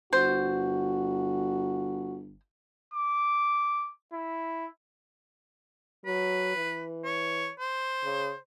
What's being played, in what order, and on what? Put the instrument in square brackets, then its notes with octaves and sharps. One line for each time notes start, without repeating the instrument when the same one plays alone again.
[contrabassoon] G1 [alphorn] F#4 [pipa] C5
[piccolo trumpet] D6
E4
[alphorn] F#3 [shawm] B4
[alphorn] E3
[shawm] C#5
C5
[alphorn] C#3